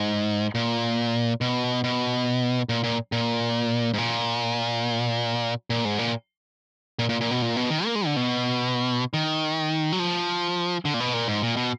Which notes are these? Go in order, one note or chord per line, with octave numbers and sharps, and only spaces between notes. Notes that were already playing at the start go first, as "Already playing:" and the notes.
Already playing: G#2
A#2
B2
B2
A#2
A#2
A#2
G#2
A#2
A#2
G#2
A#2
A#2
A#2
A#2
B2
A#2
B2
D#3
A#3
G#3
D3
B2
D#3
F#3
F3
D3
A#2
B2
A#2
G#2
A#2
B2